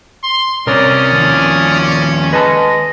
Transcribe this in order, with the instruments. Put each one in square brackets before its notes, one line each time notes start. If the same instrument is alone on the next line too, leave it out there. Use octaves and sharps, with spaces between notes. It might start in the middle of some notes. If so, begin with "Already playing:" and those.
[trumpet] C6
[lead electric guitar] C2 C4 [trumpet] C#4 [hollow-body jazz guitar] A#4 C#5 [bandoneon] D5 D#6 F6
[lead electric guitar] D#2 F3
[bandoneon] G#3 D#5 [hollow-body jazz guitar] B4 G#5 A5